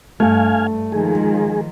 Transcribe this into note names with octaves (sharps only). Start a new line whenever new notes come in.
G2 A3 F5 G#5
D#3 F3 G#3 G#4